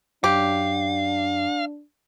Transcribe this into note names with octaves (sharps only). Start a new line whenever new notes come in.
F#2 D4 G4 F5